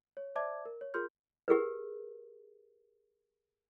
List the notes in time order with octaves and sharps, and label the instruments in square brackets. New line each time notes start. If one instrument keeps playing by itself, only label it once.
[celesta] C#5
C5 D5 E5 A5 D6 G#6
A#4
C#5
F4 G#4 A#4 C6 F6 G6
[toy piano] G4 G#4 A#4 B4